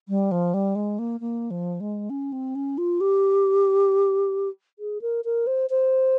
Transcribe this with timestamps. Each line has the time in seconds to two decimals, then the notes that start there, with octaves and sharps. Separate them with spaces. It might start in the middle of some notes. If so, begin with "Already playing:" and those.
0.09 G3
0.32 F3
0.54 G3
0.75 G#3
0.99 A#3
1.20 A#3
1.51 F3
1.80 G#3
2.10 C#4
2.32 C4
2.55 C#4
2.78 F4
3.01 G4
4.79 G#4
5.02 A#4
5.25 A#4
5.47 C5
5.70 C5